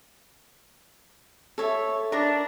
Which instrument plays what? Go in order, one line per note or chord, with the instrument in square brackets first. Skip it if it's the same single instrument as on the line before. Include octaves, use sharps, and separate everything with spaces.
[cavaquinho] A4 C#5 E5
[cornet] D4 [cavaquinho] A#4 A#5